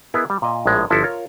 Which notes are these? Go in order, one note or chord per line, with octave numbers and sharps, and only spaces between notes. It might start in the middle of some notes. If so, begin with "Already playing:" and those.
B3 E4 G#4 A#4 B4 D#5
G3
A#2 D#5 G#5
A#1 A2 G#3
G1 F3 E4 F#4 A4 A5
F4 A#4 C#5